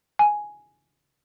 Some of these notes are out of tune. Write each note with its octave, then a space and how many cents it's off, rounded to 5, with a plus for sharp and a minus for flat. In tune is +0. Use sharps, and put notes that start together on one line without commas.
G#5 +5